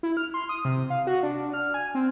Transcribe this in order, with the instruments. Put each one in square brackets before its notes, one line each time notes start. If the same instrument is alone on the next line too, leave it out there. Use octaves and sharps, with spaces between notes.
[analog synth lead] E4
F6
C6
D#6
C3
F5
F#4
D4
F6
G#5
C4